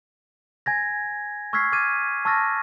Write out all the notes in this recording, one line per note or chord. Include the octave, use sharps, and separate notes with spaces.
G#5 G#6 A#6
C#6 E6 F6 G#6 B6 C7
D6 F6 G#6 A6 D#7
A5 C#6 E6 F6 A6 A#6